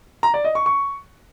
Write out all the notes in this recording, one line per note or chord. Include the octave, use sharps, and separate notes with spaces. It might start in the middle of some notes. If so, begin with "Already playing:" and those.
A#5
D5
D#5
C#6
C#6